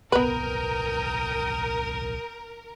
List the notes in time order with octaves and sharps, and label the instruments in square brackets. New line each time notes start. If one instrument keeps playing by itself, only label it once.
[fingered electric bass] D1 B1 [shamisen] B3 B4 [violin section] A#4 [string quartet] G5 A#5 D#6